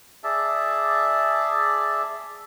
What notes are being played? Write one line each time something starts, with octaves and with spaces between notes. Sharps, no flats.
G#4 D5 E5 A5